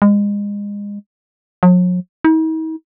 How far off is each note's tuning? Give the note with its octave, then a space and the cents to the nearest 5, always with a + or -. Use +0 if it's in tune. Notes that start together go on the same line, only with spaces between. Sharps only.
G#3 -30
F#3 -45
D#4 +45